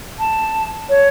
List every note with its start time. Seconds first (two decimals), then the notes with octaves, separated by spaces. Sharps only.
0.19 A5
0.89 C#5